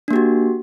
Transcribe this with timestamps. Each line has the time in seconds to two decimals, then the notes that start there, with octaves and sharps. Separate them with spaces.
0.08 D4
0.11 A#3
0.13 G4
0.16 F#4